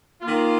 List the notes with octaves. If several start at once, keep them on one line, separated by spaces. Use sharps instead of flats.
D#3 A#3 F4